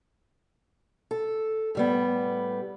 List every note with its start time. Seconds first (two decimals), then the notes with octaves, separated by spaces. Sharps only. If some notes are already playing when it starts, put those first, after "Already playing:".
1.11 A4
1.75 A2 G3 B3